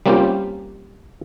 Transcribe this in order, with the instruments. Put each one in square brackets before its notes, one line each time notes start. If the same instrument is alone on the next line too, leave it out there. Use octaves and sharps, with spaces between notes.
[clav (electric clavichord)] G3 A#3 C4 C#4 F4 G4